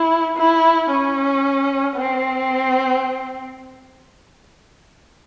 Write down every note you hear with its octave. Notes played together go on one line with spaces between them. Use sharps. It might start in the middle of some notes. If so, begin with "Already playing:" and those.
Already playing: E4
E4
C#4
C4